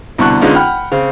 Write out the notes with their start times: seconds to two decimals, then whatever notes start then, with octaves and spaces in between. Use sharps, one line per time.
0.18 C2 B2 D3 A5 C#6 F#6
0.41 D3 G#3 B3 C#4 D#4 F4
0.55 F#5 G5 B5 F6
0.92 C#3 C4